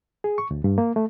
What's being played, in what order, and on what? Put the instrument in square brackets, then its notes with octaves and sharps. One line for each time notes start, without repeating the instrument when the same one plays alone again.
[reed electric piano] G#4
C#6
D2
G2
A#3
A3